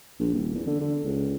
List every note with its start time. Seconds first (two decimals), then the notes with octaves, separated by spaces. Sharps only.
0.20 A#1
0.34 D#1
0.54 E2
0.67 D3
0.81 D3
1.05 C#2